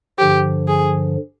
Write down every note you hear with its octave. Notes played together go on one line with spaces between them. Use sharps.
G2 D3 F3 G4
G#4